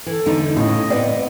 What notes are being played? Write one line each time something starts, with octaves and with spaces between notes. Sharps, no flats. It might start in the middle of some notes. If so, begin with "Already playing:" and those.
E3 A4
E2 D3 D#4
A2 C#3 D#5
B3 C4 D5